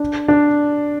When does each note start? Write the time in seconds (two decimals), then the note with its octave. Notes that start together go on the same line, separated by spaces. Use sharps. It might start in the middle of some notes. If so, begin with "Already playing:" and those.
Already playing: D4
0.28 D4